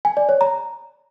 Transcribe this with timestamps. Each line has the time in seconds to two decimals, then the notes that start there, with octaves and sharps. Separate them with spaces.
0.05 G#5
0.17 D5
0.29 C#5
0.41 A#5